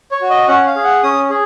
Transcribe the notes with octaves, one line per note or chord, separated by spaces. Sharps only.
C#5
F#4
D#5
C#4 F#5
F5
G#4
F#5
C#4 D#6
G#4